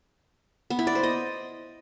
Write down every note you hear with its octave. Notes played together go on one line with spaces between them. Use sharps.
B3
E4
D5
C5
D#5